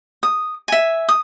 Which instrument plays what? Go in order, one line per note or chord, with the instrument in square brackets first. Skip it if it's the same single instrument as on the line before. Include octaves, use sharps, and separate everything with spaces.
[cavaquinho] D#6
E5 G#5
D#6